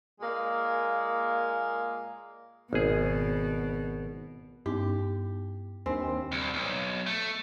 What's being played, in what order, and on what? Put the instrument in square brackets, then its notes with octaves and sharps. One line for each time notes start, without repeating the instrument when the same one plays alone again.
[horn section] A#2 G#3 A#3
[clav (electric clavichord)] G#1 G#4 [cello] B2
[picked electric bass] G2 C#4 [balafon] B3 D#4 E4 [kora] G4
[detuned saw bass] D#2 [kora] C4 [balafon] D4 C5 G#5
[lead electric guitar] C2
B1
A3